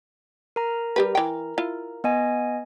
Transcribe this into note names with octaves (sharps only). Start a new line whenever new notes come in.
A#4 A#5
G3 G4 B4
E3 G5
E4 F4
B3 D#5 G#5